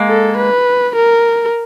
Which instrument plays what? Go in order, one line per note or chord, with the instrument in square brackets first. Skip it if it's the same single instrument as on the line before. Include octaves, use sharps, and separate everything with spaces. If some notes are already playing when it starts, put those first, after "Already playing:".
Already playing: [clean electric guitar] G#3 A#3
[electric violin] A4
B4
A#4